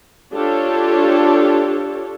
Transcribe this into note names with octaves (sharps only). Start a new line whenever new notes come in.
D4 F4 G4 A4 C#5